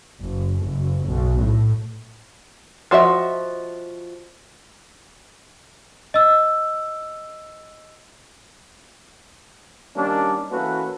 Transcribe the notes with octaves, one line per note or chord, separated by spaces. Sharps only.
F#1
F#1
B1
A2
F3 F#4 D#5 E5
D#5 E6
D#3 G3 A#3 C#4 D4
E3 A#3 C#4 F#4 A4 B4